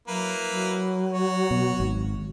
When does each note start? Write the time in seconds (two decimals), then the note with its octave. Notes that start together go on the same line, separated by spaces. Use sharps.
0.08 F#3 A#3 E4 B4
0.49 F#3
1.11 F#4 C#5
1.51 B2
1.80 G#1